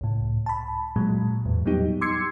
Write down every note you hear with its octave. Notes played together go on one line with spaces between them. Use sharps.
C#2 A2
A5 B5
A#2 F#3 G#3
E2 A2
F#3 G3 B3 D#4 G4
C6 D6 E6 G#6 C7 C#7